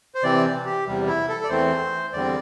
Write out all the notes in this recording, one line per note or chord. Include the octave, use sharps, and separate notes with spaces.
C5
C3 E3 C4 D5
G4
E2 C3 G3
E4
A4
D5
E2 E3 A3 C4 C5
E2 D3 G3 C4 D5